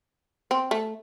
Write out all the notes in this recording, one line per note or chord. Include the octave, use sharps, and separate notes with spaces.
C4
A3